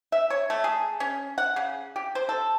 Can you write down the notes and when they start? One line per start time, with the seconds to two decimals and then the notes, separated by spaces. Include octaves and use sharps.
0.12 E5
0.30 C#5
0.50 A3
0.64 G#4
1.00 C#4
1.38 F#5
1.56 C#3
1.96 G4
2.15 C5
2.29 A4